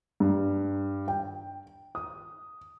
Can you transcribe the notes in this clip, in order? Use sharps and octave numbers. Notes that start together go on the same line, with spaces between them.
G2
G5
D#6